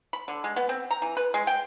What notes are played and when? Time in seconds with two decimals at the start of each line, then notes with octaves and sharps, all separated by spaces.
0.13 B5
0.28 D3
0.44 G#3
0.56 B3
0.69 C4
0.91 A#5
1.02 E3
1.17 B4
1.34 G#3
1.47 G5